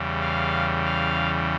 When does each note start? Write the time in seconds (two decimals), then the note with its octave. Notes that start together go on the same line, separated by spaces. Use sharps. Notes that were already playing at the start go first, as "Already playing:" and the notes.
Already playing: E2 C#3 G3
0.20 F5
0.85 F5